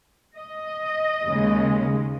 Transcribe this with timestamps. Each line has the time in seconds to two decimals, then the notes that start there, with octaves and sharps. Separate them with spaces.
0.35 D#5
1.24 D#2 C#3 G#3